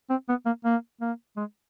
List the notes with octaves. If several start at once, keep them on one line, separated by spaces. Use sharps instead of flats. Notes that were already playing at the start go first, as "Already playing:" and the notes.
C4
B3
A#3
A#3
A#3
G#3